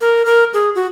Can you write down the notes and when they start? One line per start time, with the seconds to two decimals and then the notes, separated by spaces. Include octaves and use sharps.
0.01 A#4
0.26 A#4
0.54 G#4
0.75 F#4